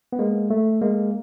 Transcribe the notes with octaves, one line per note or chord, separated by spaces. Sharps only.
B3
G#3 A#3
A3
G#3 A#3